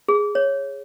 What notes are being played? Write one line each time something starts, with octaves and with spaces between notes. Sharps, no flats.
G#4
C#5